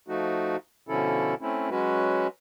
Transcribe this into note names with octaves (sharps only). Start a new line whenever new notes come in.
F3 A3 D#4 F#4
B2 D3 F3 C#4 E4 A4
A3 C4 C#4 E4
F#3 G#3 C#4 F#4 B4